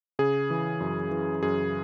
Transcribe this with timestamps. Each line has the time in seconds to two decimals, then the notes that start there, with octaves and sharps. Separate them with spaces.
0.19 C#3 G#4
0.50 E3
0.80 F#2
1.11 E3
1.43 F#2 G#4